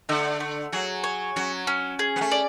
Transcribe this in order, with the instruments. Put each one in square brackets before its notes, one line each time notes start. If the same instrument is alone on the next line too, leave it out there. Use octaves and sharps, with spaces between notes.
[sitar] D3 [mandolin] A3
[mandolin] A3
[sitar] F#3 [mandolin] G#4
[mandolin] C#5
[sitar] F#3 [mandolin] C#4
[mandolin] C#4
G#4
[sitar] B3
A3
[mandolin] D5